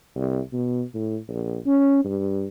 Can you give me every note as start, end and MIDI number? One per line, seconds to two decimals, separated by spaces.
0.16 0.39 36
0.53 0.83 47
0.95 1.17 45
1.29 1.57 34
1.66 2.03 61
2.05 2.46 43